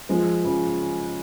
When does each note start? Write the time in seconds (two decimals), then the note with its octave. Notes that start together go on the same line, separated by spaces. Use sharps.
0.09 F3 G#3
0.44 C#3 F3